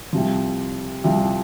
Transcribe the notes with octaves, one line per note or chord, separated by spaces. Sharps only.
C2 C3 F3
C2 C3 F3